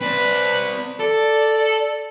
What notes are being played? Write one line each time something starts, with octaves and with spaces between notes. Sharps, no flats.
C4 B4 D5
A4 D5